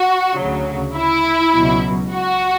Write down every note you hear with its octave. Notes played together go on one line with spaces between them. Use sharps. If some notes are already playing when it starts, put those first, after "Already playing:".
Already playing: F#4
D2 C#3 F#3
E4
C#2 B2 F#3
F#4